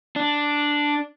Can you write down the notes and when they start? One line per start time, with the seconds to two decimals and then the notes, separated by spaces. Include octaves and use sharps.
0.16 D4